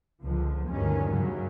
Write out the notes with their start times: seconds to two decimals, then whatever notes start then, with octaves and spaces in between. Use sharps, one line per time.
0.23 C#2 D3 F3
0.68 D2 G2 D#3 C#4
1.11 F#2 C#3 F#3 G3